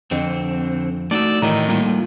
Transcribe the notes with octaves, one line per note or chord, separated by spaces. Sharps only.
F2 D3 C4
A3 D#4 F#4 D5 E6
A2 D#3 E3 D#5 A#5
G3 A#3 D#4 F4